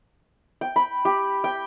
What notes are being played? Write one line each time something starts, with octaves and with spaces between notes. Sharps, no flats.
G5
B5
G4
G5